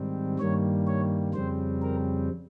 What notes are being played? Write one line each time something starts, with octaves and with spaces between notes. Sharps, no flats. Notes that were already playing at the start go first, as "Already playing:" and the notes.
Already playing: G#2 D#3 G3 C4
G2 D#3 G3 A#3 C#5
C#5
F2 C#3 G3 C4 C5
A#4